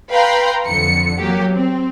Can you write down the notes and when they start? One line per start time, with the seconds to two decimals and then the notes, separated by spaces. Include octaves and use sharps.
0.11 B4 F5 G5 A#5 C6
0.68 F2 D3 C#7
1.19 F#3 A#3 G4
1.53 C4